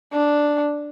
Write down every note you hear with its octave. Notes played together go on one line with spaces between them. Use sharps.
D4